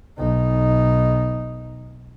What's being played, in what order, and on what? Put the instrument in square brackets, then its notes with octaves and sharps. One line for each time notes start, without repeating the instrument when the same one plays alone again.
[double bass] B1 D#4